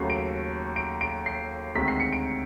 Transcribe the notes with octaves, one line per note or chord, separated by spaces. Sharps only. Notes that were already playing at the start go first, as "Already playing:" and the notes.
Already playing: D#2 C#3 F#3 A3 C7
D7
D7
D7
C7
D2 C3 D#3 G#3 B6
C7
C#7
D7